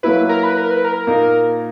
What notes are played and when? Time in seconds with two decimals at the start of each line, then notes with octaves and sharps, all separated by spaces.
0.03 F#3 A#3 E4 B4
0.29 A#4
0.43 B4
0.57 A#4
0.71 B4
0.84 A#4
1.07 A#2 A#3 D#4